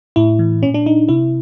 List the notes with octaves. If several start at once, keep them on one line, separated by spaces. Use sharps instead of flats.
A2 E4
E3
A#2 C#4
D4
D#4
C3 E4